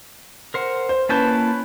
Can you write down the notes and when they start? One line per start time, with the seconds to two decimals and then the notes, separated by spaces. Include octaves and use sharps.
0.54 A#4 C5 F#5
0.89 C5
1.09 A#3 C#4 E4 B4 A5 G6